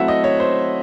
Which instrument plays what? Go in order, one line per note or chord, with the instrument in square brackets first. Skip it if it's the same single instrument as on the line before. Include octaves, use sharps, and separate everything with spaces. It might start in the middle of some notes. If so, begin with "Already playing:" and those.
Already playing: [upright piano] F#3 A3 C4 E4 E5 F#5
D#5
C#5
C5